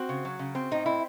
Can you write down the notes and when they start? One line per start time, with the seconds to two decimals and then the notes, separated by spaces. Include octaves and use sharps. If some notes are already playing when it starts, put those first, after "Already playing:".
Already playing: C4 F#4
0.09 C#3
0.25 F#3
0.39 C#3
0.55 C4
0.71 A2 D#4
0.86 C4 E4